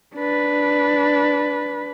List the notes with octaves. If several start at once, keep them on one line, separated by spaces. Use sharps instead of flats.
D4 B4